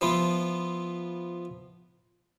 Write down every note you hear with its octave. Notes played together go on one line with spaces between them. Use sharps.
F3 B3 E4 F4